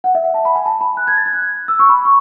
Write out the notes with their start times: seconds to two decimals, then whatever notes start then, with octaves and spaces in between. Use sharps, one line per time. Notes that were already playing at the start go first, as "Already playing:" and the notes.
0.04 F#5
0.15 E5
0.24 F#5
0.34 A5
0.45 B5
0.55 G#5
0.66 A5
0.81 B5
0.97 F#6
1.07 G#6
1.17 A6
1.26 G#6
1.33 F#6
1.42 G#6
1.68 E6
1.79 C#6
1.89 B5
2.05 C#6